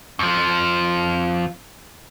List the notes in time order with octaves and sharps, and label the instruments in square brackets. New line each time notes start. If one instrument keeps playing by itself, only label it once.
[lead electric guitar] F2 F3